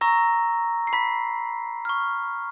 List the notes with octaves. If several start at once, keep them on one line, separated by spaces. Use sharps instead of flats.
A#5 C#6 E6 A#6
C7
B5 B6
C#6 F6